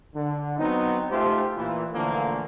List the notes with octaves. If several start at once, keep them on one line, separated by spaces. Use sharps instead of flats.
D3
F#3 B3 C4 D#4
G#2 A3 F4 G4 C5
A#2 E3
A#2 D3 E3 F3 A3 A#3